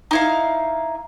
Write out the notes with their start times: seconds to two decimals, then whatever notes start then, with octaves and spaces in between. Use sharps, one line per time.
0.11 D#4 E4 F5